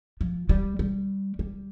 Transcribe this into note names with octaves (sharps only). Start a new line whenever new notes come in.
F3
G3
G3
G3